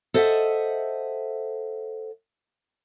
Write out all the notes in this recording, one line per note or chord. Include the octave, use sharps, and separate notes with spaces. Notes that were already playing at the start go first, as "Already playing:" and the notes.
A4 C5 D#5 E5 F#5